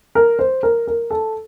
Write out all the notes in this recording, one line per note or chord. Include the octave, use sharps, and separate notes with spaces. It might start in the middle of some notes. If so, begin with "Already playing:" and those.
A#4
C5
A#4
A#4
A4